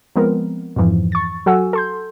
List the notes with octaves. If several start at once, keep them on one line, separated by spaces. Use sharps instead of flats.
F3 G#3 B3 C4 A#4
F2 G#2 E3 F3
C#6 A6
F#3 F#4 A4 F#5 G#5 E6
A4 C6 G6